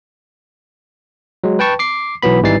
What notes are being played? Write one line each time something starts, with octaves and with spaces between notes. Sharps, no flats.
F#3 G#3
B4 G5 A5 C#6
D6 C7
B1 E3 F#3 B3 B5
G#1 E3 G3 D#4 A6 C7